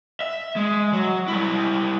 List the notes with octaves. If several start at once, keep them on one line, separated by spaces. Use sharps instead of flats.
E5
G#3
F#3
G3 E4